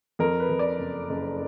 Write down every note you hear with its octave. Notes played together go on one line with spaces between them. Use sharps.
F2 A#4
B4
F2
D5
F#1
F#1